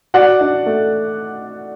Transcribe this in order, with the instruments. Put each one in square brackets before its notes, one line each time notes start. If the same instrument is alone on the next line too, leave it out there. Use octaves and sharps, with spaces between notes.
[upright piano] F#4 [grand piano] D5 F#5
[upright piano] D4
A3